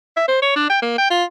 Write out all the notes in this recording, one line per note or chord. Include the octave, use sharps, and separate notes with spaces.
E5
C5
C#5
D4
G5
A#3
G5
F4